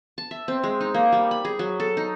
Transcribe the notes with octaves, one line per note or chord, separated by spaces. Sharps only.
A5
E5
C4
G#3
D#4
A#3
G3
B5
G#4
F#3
A4
D#4